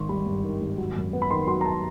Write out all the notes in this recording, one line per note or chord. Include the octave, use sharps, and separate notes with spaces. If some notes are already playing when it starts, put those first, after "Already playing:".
Already playing: G#1 D#3 C6 C#6
G3 B5
G2
D#3
G#1
F#3
F#2
B3
B5
D#3 C6
F#3 C6
A#5
A5